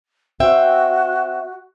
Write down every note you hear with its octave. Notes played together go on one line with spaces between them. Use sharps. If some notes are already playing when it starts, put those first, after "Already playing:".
C4 F#4 E5 G5